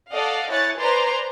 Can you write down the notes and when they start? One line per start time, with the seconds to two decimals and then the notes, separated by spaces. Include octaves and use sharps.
0.11 A4 D5 D#5 F5 F#5
0.50 E4 C#5 G#5 F#6 A6 C#7
0.79 B4 C5 D5 G#5 A#5 C6